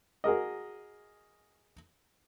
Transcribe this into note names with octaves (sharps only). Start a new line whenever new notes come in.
F#4 G#4 A#4 D#5